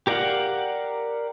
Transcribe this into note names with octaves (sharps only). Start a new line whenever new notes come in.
G4 A#4 D5 F5 F#5